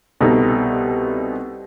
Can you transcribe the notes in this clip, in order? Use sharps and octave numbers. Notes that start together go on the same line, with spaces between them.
C2 B2 D#4 A4